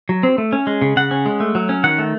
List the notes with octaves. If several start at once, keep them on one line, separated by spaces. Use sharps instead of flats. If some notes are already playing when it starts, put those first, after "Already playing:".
F#3
C4
A3
C#4
G#3
C#3
C#3 F#5
C#4
G#3
A3
F#3
C#4
D#3 F#5
A3